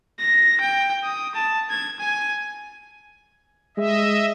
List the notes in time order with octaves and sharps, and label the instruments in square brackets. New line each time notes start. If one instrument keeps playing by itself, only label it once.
[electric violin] A#6
G5
D#6
A5
G#6
G#5
[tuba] G#3 [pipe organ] D#5 E5